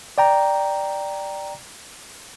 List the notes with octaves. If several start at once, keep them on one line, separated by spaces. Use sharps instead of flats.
D5 G5 A#5